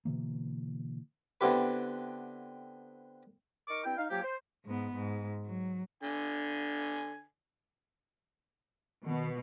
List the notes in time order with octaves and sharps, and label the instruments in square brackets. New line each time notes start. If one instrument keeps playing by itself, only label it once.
[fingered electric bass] B2 D3 E3 A#3
[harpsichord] D3 B3 C4 E4 G4 B4
[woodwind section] D#4 A#4 C#6 D6
G2 C4 E4 G5
D#4 F5
F3 F#3 A#3 C#4 G4
C5
[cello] G#2 B3
G#2
F#3
[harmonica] D3 G#5
[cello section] B2 [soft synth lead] D#3